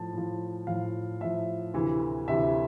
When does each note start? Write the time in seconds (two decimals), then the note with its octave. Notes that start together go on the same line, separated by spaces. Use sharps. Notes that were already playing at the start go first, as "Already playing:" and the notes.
Already playing: A2 F3 A5
0.13 A2 F3
0.67 A2 F3 F5
1.21 A2 F3 E5
1.74 D2 C3 E3
2.28 D2 C3 E3 E5